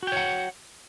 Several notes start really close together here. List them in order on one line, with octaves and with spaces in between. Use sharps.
F#4 G5 C#5 F#5